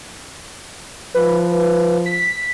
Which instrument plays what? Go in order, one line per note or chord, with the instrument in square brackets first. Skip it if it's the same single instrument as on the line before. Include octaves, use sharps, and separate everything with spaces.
[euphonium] F3 [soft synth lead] B4
[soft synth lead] B6